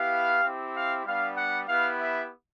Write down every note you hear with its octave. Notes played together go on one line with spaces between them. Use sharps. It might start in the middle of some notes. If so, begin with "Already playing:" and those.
Already playing: B3 E4 G4 F5
C4 E4 G4
F5
G3 B3 D4 F5
F#5
B3 E4 G4 F5
E5